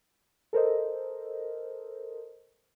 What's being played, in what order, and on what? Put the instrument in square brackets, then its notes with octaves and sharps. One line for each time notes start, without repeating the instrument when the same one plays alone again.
[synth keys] A4 A#4 C5 D#5